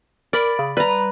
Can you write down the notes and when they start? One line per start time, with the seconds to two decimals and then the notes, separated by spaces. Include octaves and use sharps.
0.33 A#4 D5 B5
0.59 C#3
0.77 G3 B4 A#5